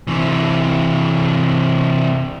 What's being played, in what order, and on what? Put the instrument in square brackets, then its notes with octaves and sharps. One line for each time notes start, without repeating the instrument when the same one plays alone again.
[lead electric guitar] C3 E3